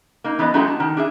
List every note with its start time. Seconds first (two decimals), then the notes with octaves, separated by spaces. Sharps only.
0.24 A#3 D#4
0.39 E3 B3 B4 D#5
0.54 F#3 G#3 A3 D4 E4 G4
0.67 A5
0.80 D#3
0.97 D4 G#4 E5